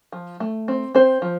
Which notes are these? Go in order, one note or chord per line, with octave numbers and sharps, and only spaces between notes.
F3
A3
C4
C4 C5
F3